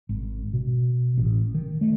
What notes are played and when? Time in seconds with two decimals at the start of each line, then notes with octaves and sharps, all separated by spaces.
0.09 G#1
0.53 B2
1.18 A1
1.54 D#3
1.81 A3